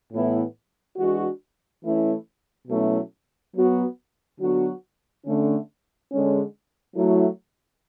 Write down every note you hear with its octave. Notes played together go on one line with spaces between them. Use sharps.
A2 E3 B3 E4
E3 G#3 D4 F#4
E3 A3 C#4 E4
B2 F#3 A3 C#4 E4
F#3 B3 F#4
D3 F#3 B3 F#4
D3 A3 C#4
D3 G#3 C#4
F#3 A3 E4